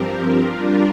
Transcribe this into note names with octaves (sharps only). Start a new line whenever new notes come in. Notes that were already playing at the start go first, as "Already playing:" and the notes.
Already playing: G2 F3 C4 G4 A#4
G3 D4 F4 A#4